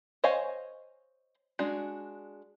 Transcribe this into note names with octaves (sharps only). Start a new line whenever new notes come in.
C5 C#5 D#5 F5 G#5
G#3 D4 F#4